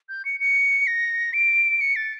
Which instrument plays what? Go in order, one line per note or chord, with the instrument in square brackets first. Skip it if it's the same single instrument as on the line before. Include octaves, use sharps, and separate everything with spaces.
[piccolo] G6
C#7
C#7
A#6
D7
C#7
A6